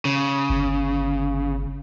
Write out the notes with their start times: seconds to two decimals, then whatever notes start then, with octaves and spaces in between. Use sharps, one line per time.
0.05 C#3
0.50 G1